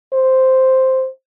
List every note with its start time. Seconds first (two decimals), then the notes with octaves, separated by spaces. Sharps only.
0.13 C5